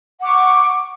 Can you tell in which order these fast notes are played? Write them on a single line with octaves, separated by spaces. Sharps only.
F#5 D6 C#6